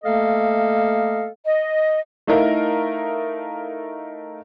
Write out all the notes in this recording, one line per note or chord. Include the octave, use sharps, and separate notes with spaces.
A3 A#3 A4 D#5 F5
D#5
A3 D#4 E4 A#4 D#5 F5